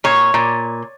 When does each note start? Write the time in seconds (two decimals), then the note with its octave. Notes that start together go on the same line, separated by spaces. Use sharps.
0.04 A#2 C#5
0.34 A#2